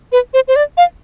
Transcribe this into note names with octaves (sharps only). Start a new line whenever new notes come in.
B4
C5
C5
D5
F5